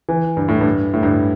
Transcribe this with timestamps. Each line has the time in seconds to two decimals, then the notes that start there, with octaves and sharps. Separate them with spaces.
0.09 E3
0.37 G2
0.48 A2
0.61 G2
0.94 A2
1.03 G2